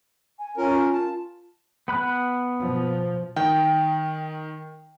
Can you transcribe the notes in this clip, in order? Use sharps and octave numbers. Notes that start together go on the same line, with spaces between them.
G#5
C#4 F4 A#4
A5
B3 B5 F#6
B2 F3
D#3 G5